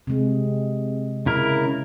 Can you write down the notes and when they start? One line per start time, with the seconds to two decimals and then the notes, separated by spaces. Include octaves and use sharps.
0.07 C3 G#3
1.26 C#3 E4 A#4